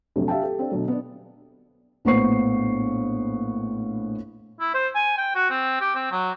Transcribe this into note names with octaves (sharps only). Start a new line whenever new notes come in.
A#1 F2 C3 F#3 A3
G4 E5 F5 G5 A5
G4 A4
C4 D4
B2 D3 F#3 A3
B3 D4
A#1 A2 B3 C5 C#6 C7
E4
C5
G#5
G5
F#4
C4
G4
C4
F#3